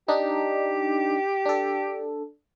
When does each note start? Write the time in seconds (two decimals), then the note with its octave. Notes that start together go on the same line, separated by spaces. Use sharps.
0.08 D4 D#4 G4
1.46 D4 A4